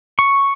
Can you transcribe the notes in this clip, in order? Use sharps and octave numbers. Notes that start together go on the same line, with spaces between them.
C#6